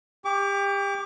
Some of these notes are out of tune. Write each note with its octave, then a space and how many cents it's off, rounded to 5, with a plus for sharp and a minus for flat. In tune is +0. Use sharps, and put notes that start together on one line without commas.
G4 +30 D6 -30